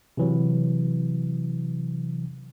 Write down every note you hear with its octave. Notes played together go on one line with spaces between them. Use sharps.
C3 E3 F#3